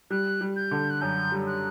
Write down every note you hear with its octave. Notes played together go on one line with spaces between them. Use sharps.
G3 F#6
G3
G6
D3
F#6
F#2 G6
G3
F#6